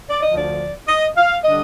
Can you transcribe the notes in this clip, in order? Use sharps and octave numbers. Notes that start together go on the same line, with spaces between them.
D5
D#5
D2 D3 F3
D5
D#5
F5
D3 G3 D4 D#5